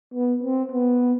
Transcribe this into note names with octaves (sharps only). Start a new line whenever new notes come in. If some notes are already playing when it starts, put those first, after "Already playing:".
B3
C4
B3